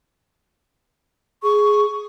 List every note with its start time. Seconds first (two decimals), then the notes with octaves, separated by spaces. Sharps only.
1.43 G#4 C#6